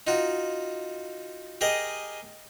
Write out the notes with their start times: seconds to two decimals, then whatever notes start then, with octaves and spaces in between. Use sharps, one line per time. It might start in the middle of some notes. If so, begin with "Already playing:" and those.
0.07 D#4 F4 F#4
1.61 G4 G#4 A#4 D#5